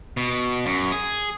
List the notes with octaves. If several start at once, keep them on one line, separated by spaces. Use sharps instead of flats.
B2
F#2
G#4